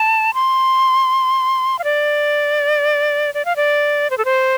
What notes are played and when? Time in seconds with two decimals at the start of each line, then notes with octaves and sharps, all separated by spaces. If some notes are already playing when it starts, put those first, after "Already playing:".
Already playing: A5
0.34 C6
1.79 F5
1.84 D5
3.34 D5
3.45 F5
3.56 D5
4.10 C5
4.18 A4
4.25 C5